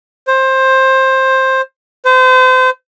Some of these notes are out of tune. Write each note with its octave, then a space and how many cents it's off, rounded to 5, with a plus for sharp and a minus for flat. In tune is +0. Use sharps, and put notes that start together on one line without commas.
C5 +15
C5 -35